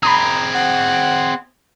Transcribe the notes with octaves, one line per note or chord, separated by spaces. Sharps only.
C4 G#4 A#5 B5 D#6
F#5